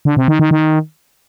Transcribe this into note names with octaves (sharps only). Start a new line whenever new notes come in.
D3
C3
D#3
D#3
D#3